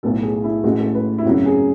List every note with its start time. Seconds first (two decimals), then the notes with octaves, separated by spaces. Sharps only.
0.03 B1 A2 F#3 B3 A4
0.23 G#4
0.44 E4
0.64 A1 A2 G#3 F#4
0.80 A4
0.95 B4
1.18 E4
1.25 G#1 F#2 C#3 F#3 F#4
1.46 G#4